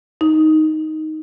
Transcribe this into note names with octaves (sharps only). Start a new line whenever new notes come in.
D#4